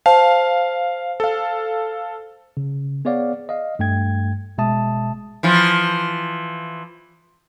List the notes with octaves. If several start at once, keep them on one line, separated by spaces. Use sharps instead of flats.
C5 F5 A5
A4 F5
C#3
B3 G#4 C#5 D5 F5 F#5
D#5 F5
G2 A3 G5 G#6
G1 B2 G#3 E5 A5 D#6
E3 F3